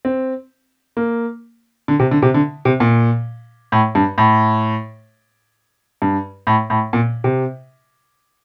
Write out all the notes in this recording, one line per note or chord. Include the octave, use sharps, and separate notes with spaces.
C4
A#3
D3
C3
D3
C3
D3
C3
A#2
A2
G2
A2
G2
A2
A2
A#2
C3